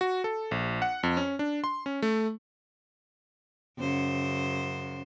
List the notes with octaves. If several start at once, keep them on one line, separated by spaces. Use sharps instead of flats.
F#4
A4
A#1
F#5
F2
C#4
D4
C6
C#4
A3
F#2 C#3 C5